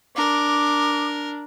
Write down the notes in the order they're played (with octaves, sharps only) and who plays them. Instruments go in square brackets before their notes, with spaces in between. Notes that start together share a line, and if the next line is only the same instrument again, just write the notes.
[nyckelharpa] D4 [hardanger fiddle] A#4 [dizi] D6